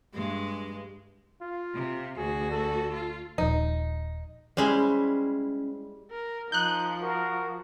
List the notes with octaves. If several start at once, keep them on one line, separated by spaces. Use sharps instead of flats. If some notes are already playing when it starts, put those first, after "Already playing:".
G2 G#3
F4
C3
D2 F#4 G#4
A4
F4
D#1 F3 D#4
G3 G#3 C#4 E4 C5
A#4
F3 D#4 F#6 G6
F#4 A#4